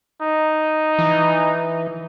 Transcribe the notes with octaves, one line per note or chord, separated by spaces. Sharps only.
D#4
E3